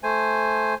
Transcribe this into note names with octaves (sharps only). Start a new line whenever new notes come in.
A3 C5 G#5